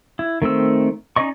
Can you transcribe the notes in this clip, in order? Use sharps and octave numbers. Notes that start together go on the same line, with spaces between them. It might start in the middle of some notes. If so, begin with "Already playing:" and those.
E4
D#3 A3 C4 E6
C#4 D#4 D5 D#5 C#6